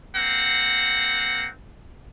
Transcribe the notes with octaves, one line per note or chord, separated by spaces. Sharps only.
A#3 C4 F#5